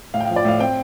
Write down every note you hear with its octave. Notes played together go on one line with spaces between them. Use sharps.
A2 F5
G5
F3 F5
D5
A2 F5
C4 G5